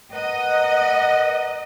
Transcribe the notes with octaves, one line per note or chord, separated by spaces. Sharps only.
A#4 B4 D#5 F#5